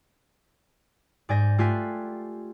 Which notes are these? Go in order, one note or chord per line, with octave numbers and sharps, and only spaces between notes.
G#2 D5 G#5 G6 A#6
A3 F4 G4 G#5 F#6 B6